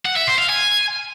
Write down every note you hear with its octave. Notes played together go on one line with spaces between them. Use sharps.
F#5
E5
C5
F5
G#5